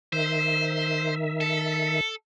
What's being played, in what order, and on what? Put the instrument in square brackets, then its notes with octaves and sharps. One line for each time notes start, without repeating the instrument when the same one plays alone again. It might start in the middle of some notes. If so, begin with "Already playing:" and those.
[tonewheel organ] D#3 E5 [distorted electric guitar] C5
[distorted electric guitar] A4